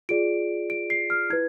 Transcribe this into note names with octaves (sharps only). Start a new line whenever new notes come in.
F4 G#4 D5 D7
D7
C7
F6
E4 B4 G#6